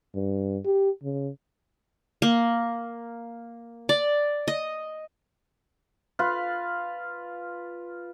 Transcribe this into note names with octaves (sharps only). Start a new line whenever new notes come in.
G2
G4
C#3
A#3
D5
D#5
F4 B4 F5